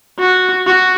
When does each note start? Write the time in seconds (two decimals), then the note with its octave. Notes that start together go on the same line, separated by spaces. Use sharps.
0.20 F#4
0.67 F#4